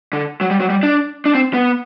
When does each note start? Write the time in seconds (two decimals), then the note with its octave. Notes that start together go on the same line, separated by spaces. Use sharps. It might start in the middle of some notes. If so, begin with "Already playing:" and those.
0.13 D3
0.41 F#3
0.51 G3
0.60 F#3
0.70 G3
0.83 D4
1.26 D4
1.35 C4
1.53 B3